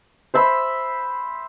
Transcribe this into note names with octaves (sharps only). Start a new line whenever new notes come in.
C5 E5 B5